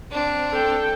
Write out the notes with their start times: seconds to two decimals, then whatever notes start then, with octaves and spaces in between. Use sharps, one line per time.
0.12 C4 D4
0.51 A4 G5